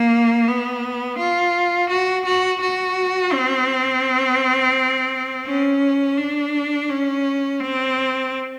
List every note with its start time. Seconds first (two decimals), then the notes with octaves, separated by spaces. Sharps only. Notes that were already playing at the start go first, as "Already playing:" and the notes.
Already playing: A#3
0.48 B3
1.19 F4
1.90 F#4
2.26 F#4
2.61 F#4
3.33 C4
5.46 C#4
6.18 D4
6.89 C#4
7.60 C4